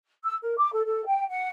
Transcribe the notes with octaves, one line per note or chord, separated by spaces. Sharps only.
E6
A#4
D6
A4
A4
G5
F#5